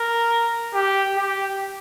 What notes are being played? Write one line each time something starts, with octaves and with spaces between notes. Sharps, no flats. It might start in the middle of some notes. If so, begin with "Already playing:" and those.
Already playing: A#4
G4
G4